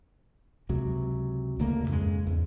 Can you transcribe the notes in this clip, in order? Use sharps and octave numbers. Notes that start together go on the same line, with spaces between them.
C#2 C3 F#3
D#1 D2 C#3 A#3
F2 G#2 C#3 G#3
E2